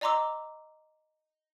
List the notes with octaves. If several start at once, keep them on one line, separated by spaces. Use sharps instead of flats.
D5 D#5 A#5 C6 D6 E6